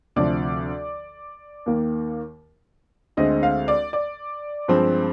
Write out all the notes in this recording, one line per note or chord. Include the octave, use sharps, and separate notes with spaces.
D2 C3 F3 D5
D#2 D#3 A#3
D2 D3 G#3 C4 D#5
F5
D5
D5
G2 F3 G#3 C4